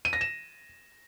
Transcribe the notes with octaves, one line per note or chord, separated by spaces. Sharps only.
D#7
A#6
E7